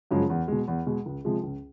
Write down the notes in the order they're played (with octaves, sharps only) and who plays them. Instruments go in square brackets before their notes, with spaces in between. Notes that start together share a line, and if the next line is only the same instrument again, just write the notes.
[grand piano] F#2 C#3 F3 G#3
E2
B2 G#3
E2
B2 G#3
C#2
C3 F3 G#3
C#2